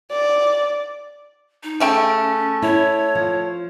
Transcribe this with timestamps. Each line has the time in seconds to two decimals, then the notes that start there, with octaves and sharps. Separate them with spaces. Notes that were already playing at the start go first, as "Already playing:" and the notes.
0.11 D5
1.63 D#4
1.80 C#3 A3 C#4 G5
2.62 E4 C#5
3.15 F3